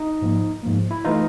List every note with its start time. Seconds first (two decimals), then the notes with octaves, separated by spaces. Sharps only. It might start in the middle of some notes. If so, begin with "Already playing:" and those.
Already playing: D#4
0.21 G#2 F3 A#3
0.63 G#2 F3 A#3
0.91 E4
1.05 E3 A3 D#4 F4